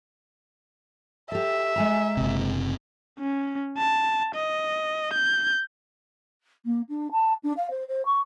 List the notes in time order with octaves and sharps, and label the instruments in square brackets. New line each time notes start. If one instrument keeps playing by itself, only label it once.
[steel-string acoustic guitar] G4 A4 [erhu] E5
[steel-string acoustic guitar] G#3 G#5 A#5
[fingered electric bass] F#1 C3
[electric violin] C#4
A5
D#5
G6
[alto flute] A#3
D4
A5
D4
F5
C5
C5
C#6